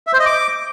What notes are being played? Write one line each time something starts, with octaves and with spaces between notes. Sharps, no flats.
E5
C5
D#5
D6